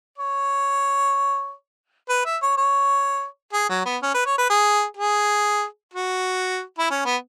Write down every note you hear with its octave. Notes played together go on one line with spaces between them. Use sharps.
C#5
B4
E5
C#5
C#5
G#4
F#3
B3
C#4
B4
C#5
B4
G#4
G#4
F#4
E4
C#4
B3